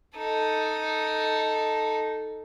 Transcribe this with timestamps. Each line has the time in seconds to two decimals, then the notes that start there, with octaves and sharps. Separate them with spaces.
0.17 D#4 A4